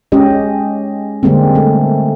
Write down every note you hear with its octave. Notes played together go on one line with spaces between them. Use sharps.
G#3 C#4 G4 D#5
D3 G3 G#3 A#3 C4
A3